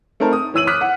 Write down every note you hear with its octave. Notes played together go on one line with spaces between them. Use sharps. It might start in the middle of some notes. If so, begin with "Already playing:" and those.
A3 C4 D#4 A#4 C5 A5
D#6
E3 C#5 E6 D#7 F#7
D6 D#6 F6 F#6 B6
F#5